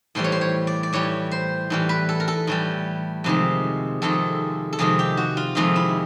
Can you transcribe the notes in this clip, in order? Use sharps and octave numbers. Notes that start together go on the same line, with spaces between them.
A2 E3 G3 C5
C#5
C5
C#5
D5
D5
A2 E3 G3 C#5
C5
A2 E3 G3
B4
A4
A#4
A4
A2 E3 G3
F2 C3 D#3 G#3
F2 C3 D#3 G#3 A4
A4
F2 C3 D#3 G#3 G#4
G4
F#4
F4
F2 C3 D#3 G#3 F4
E4